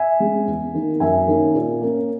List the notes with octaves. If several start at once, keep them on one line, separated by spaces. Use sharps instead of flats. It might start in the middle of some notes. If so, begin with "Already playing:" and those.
Already playing: E5 G#5
G#3 C#4
E2
D#3 A#3
F#2 E5 G#5
D#3 A#3 C#4
A#2
A#3 C#4